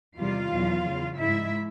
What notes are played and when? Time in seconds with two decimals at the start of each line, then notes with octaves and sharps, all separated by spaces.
0.18 E2 C3 D#3 G3 F4 F5
0.51 E2 B2 F#3
0.84 E2 C#3 F#3
1.17 G#2 F3 E4 E5